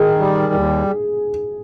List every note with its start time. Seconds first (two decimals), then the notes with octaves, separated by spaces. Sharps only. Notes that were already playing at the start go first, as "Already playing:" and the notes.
Already playing: D#3 G#4
0.19 G3
0.53 D#2